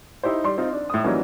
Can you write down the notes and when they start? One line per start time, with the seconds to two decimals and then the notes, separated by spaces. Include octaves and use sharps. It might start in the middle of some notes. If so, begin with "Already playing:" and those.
0.23 D#4 E4 G4 C5
0.44 G3 C6
0.58 C4 D#4 F4
0.73 D4
0.90 A2 D#6
1.04 E3 F#3 G3 A#3 C#4 D#4